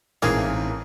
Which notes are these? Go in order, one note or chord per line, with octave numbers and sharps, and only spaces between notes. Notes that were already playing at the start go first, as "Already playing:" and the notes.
A1 G#2 E3 A#3 C4 G#4 F5 G#5